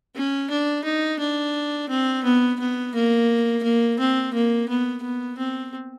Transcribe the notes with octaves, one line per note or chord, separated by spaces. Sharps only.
C#4
D4
D#4
D4
C4
B3
B3
A#3
A#3
C4
A#3
B3
B3
C4